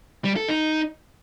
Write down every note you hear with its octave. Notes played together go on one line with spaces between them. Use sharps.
G3
A4
D#4